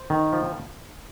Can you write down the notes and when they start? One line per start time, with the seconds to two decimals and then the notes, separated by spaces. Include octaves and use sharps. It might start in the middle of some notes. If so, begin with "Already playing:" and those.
Already playing: C5
0.10 D#3
0.32 F3